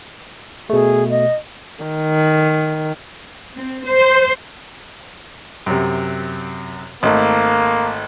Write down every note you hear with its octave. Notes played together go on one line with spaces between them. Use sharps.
B2 A3 G#4
D#5
D#3
C4
C5
F#2 C3
G#1 A3 A#3